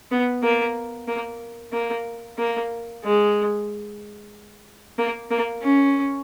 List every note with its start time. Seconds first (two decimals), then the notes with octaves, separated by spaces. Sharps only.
0.11 B3
0.43 A#3
1.08 A#3
1.73 A#3
2.38 A#3
3.04 G#3
4.98 A#3
5.31 A#3
5.62 C#4